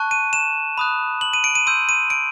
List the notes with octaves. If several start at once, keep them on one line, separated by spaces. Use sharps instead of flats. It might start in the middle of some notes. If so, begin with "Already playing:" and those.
Already playing: A5 C#6 F#6
D#7
E7
B5 D#6 F#6
F#7
D#7
D7
D#7
C6 E6 G6 D#7
D#7
D7